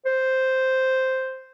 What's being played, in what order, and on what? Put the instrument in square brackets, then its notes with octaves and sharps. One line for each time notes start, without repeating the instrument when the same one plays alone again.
[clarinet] C5